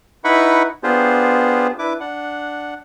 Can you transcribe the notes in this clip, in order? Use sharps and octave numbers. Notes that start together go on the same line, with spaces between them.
D#4 E4 B4 F#5 B5 C#6
B3 D4 F4 G4 G#4 C5
D4 E4 B4 D6
D4 F#5